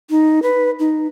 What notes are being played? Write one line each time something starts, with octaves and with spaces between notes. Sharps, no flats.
D#4
B4
D#4